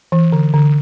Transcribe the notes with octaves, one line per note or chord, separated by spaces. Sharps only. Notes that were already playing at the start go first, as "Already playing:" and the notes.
E3
D3
D3